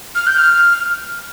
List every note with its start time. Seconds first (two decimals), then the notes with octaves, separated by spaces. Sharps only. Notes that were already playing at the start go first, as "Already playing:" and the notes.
0.15 F6
0.27 G6
0.38 F6